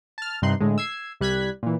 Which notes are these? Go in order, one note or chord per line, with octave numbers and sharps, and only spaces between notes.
A5 F6
G2 C3 D#4 C6 F#6
A2 D3 G#3
E6 G#6 C7
C2 G3 F#6 G#6 B6
A#2 E3